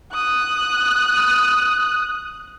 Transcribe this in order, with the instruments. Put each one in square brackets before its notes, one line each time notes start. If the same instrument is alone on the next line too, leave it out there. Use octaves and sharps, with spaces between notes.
[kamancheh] D#6 F#6